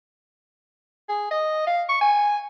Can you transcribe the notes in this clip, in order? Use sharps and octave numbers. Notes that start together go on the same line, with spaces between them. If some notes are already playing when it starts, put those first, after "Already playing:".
G#4
D#5
F5
C#6
G#5